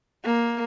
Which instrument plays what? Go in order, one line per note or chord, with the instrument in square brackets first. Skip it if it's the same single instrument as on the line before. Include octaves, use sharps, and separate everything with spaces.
[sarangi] A#3